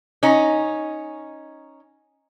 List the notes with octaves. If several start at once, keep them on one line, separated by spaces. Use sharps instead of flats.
C#4 D#4